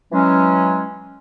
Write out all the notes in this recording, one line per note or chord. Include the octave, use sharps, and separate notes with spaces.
E3 F#3 G#3 C#4